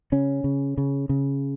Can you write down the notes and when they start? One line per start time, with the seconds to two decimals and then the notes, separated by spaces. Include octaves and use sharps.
0.12 C#3 C#4
0.44 C#3
0.78 C#3
1.09 C#3